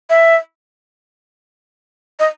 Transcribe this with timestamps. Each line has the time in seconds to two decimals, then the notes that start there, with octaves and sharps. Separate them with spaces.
0.10 E5
2.20 D#5